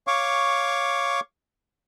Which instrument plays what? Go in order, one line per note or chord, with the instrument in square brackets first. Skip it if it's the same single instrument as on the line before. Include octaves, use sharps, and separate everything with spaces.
[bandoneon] C#5 F5 C#6 D6